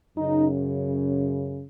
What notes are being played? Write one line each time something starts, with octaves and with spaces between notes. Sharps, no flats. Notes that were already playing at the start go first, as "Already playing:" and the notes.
F#2 C#3 D#4